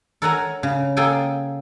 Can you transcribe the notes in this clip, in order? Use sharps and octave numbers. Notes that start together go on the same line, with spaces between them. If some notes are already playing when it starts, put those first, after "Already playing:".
A4 A#4 C#5 F#5 G#5 A#5
C#3
A#3 G#4 A4 G5 G#5